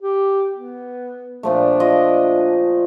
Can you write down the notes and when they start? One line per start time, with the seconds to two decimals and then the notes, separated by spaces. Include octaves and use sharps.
0.02 G4
0.55 B3
1.43 A#2 F3 A3 D4
1.80 F4 D#5